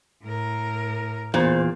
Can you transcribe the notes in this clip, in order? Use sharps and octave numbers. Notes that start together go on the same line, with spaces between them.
A2 A#4
E2 A#2 C5